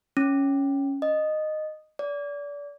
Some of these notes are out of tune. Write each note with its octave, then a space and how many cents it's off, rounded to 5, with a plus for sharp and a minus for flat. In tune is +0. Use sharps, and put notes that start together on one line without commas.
C#4 +0
D#5 -10
D5 -30